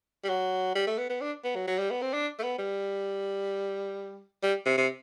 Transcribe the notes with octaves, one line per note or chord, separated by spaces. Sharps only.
G3
F#3
G3
A3
B3
B3
D4
B3
F#3
F#3
G3
B3
C4
D4
A3
B3
G3
G3
C3
C3